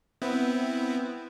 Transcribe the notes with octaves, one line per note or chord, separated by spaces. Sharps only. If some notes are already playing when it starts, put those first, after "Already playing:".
B3 C4 E4